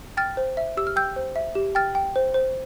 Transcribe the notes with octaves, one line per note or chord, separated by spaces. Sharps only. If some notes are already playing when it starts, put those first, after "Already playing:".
G5 F6 A6
C5
E5
G4 E6
F6
G5 E6 G6
C5
E5
G4
G5 F6 A6
G5
C5
C5